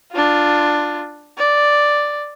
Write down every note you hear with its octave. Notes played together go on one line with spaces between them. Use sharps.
D4 F4
D5